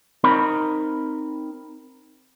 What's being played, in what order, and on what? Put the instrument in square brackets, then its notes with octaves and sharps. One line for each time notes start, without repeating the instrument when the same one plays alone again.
[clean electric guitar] C4 D#4 A#4 B5